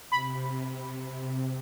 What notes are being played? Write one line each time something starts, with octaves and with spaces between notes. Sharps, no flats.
C3 B5